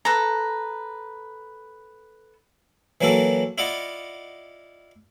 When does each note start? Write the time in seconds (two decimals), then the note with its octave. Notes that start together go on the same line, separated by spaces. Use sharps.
0.05 A4 B4 A#5
3.01 E3 F#3 A#3 F#4 A4
3.58 E4 F4 D5 D#5 F#5